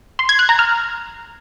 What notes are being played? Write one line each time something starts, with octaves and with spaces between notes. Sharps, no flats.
C6
G#6
F#6
A#5
F6